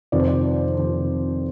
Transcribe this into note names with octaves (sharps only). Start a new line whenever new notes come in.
F2 C3 D#3 D5
C5
D5
F2 C3 D#3